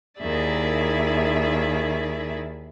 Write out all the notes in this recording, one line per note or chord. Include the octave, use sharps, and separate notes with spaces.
D#2 D#3 E4 G#4 D5 E5